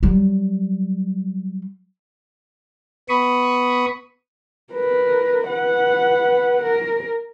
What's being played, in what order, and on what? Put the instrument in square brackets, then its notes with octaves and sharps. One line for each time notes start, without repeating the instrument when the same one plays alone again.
[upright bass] F#3 G3
[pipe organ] B3 B5 C#6 D#6
[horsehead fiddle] A#4 B4
B4 F#5
A#4